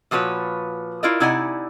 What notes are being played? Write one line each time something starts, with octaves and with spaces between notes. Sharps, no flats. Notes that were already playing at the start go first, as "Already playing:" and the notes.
A#2 F3 F#4 B4 C#5
E4 F4 A#4 D5 D#5
C3 D#4 E4 D5 F#5 G#5